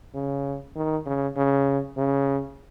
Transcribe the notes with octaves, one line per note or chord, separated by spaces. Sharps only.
C#3
D#3
C#3
C#3
C#3